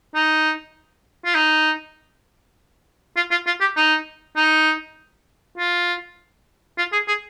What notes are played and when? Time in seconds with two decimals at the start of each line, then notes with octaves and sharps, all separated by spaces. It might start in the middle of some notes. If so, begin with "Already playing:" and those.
0.15 D#4
1.25 F4
1.35 D#4
3.16 F4
3.31 F4
3.46 F4
3.60 G4
3.76 D#4
4.36 D#4
5.58 F4
6.78 F4
6.92 G#4
7.08 G#4